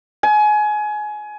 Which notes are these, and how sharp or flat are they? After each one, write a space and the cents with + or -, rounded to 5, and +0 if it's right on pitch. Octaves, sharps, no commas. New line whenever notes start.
G#5 +25